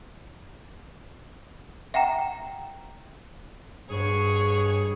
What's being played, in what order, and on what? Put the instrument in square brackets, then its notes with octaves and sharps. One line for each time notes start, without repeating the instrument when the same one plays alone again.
[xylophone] E5 F#5 G5 A#5
[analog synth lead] G2 [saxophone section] B2 F3 G#4 [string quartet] C#5